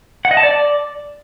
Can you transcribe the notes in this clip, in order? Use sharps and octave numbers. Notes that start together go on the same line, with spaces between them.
F#5
D#5
A5
D5